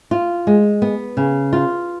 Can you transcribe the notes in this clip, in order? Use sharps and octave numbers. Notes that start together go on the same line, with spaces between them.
F4
G#3
B3
C#3
F4